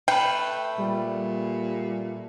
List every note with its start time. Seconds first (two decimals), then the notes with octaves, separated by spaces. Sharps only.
0.08 A3 B4 G5
0.78 A#2 G3